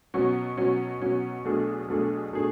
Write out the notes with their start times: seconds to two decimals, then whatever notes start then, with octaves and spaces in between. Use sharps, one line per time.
0.14 B2 F#3 C#4
0.57 B2 F#3 C#4
1.01 B2 F#3 C#4
1.45 B1 B2 A3 D4 G#4
1.88 B1 B2 A3 D4 G#4
2.33 B2 A3 D4 G#4